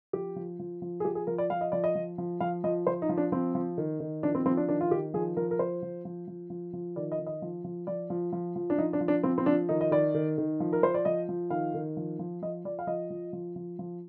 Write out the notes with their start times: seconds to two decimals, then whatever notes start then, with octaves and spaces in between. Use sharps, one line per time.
0.13 F3 G4
0.36 F3
0.59 F3
0.82 F3
1.00 G#4
1.05 F3 G4
1.15 G#4
1.27 F3 A#4
1.38 D5
1.50 F3 F5
1.61 D#5
1.72 F3 D5
1.84 D#5
1.95 F3
2.18 F3
2.40 F3 F5
2.64 F3 D#5
2.87 F3 C5
3.02 D#4
3.09 F3
3.17 D4
3.32 F3 C4
3.55 F3
3.78 D#3
4.00 D#3
4.23 F3 D4
4.35 C4
4.45 F3 C4
4.57 D4
4.68 D#3 D4
4.81 F4
4.91 D#3 G4
5.14 F3 G#4
5.37 F3 A#4
5.51 A#4
5.59 F3 C5
5.82 F3
6.05 F3
6.28 F3
6.50 F3
6.73 F3
6.96 D#3 D5
7.12 D#5
7.19 D#3
7.26 D#5
7.42 F3
7.64 F3
7.87 F3 D5
8.10 F3
8.32 F3
8.56 F3
8.70 D4
8.78 F3 D#4
8.93 D4
9.01 F3
9.08 D4
9.23 F3 C4
9.38 C4
9.46 F3 D4
9.69 D#3 D#4
9.81 D#5
9.91 D#3 D5
10.14 D#3
10.38 D#3
10.60 F3
10.73 A#4
10.83 F3 C5
10.94 D5
11.05 F3 D#5
11.29 F3
11.50 D#3 F5
11.74 D#3
11.97 F3
12.19 F3
12.42 F3 D#5
12.65 F3 D5
12.79 F5
12.87 F3 D#5
13.10 F3
13.33 F3
13.56 F3
13.79 F3